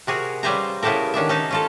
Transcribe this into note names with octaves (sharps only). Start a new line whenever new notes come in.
C3 F#4 G#4 A#4
C#3 G3 B4 C5 G#5 A#5
C#3 B3 E4 G4 A4 A#4
D#3 C#4 D4 E5
C#4 D#4 A5
C#4 F4 A4